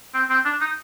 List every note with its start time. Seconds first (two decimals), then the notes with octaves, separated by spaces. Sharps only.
0.14 C4
0.29 C4
0.45 D4
0.61 D#4